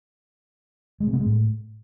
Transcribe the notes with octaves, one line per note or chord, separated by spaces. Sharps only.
G#3
C3
B3
G#3
A2